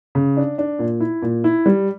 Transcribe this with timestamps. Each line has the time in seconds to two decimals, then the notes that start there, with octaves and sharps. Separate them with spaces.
0.15 C#3
0.37 D4
0.58 D4
0.79 A#2
1.00 E4
1.22 A#2
1.44 E4
1.66 G3